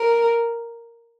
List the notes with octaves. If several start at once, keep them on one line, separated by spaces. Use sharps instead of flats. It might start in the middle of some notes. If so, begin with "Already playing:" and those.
Already playing: A#4